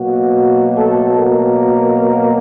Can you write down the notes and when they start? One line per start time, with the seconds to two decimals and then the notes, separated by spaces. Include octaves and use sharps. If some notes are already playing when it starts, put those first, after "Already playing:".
Already playing: B2 F#3 A#3 F#4
0.76 A3 A4
1.17 A#3 A#4